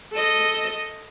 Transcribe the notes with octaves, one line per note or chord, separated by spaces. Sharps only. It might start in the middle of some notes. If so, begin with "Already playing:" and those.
A4 D#5